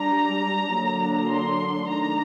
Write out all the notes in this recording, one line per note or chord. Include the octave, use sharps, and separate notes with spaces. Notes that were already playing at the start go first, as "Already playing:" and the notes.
Already playing: G3 D4 A#5
D3 F#3 A#3 D4
C6
D#3 A3 D4 A#5